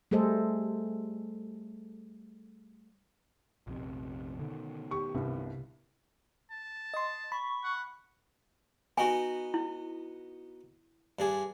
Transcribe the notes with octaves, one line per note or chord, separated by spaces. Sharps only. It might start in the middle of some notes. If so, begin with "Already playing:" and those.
G3 A3 G#4 A4 C5 D#5
A#1 F2 C3
B2 D3 D#3
G4 C#6
C2 G2 C3
A5
D#5 C6
B5 C#6
F#5
B3 D#4 F#4 G#5
E4
G2 D4 G#4